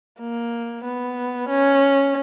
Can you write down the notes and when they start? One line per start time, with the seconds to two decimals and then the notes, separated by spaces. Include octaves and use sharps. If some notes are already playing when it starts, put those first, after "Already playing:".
0.20 A#3
0.84 B3
1.49 C#4